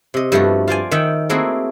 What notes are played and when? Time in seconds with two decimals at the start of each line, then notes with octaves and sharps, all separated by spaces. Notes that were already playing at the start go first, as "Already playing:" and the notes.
0.14 C3 D#5
0.32 G2 F3 A3 B3 F#4
0.68 F4 C5 D5 G#5
0.91 D#3 E5 F#5 G5
1.29 A3 A#3 C4 E4 F#4 G#4